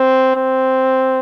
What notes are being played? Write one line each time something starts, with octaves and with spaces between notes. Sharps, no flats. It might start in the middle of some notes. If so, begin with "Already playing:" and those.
Already playing: C4
C4